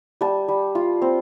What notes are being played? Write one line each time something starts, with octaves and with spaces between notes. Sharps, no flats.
G3 A5
G3
F4
C4